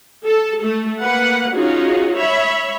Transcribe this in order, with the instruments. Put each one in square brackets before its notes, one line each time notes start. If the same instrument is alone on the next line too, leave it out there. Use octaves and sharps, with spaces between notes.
[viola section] A4
A3 A4
A#3 B4 F#5
C#4 D#4 F4 F#4 G#4
C#5 E5 B5